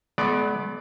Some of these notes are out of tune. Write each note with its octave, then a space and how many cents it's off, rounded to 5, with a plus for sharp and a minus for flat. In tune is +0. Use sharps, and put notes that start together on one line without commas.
G#3 +45 B3 +0 D5 +0